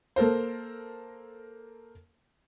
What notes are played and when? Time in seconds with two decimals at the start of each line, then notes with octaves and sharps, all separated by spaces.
0.16 A#3 A4 A#4 C5